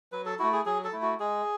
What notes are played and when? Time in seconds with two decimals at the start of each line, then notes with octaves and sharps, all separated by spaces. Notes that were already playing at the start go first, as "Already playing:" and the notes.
0.12 F#3 B4
0.26 A4
0.39 A3 E4 F#4
0.53 G#4
0.66 F#3 G#4
0.84 A4
0.93 A3 E4
1.02 F#4
1.20 G#3 G#4